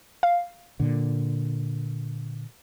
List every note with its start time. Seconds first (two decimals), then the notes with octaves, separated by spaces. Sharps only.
0.23 F5
0.80 A#2 D3